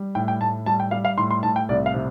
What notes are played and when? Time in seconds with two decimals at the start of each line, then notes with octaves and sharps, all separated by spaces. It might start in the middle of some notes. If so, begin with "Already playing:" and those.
Already playing: G3
0.15 A2 G5
0.28 G5
0.40 A2 A5
0.66 G3 A5
0.80 G5
0.91 G3 F5
1.05 F5
1.18 A2 C6
1.31 C6
1.43 A2 A5
1.56 G5
1.69 C2 D5
1.86 F5
1.94 C3